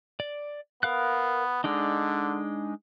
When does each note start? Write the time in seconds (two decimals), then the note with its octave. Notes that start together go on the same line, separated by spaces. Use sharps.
0.20 D5
0.83 B3 A#4 F5 F#6
1.64 D3 G#3 D4 D#4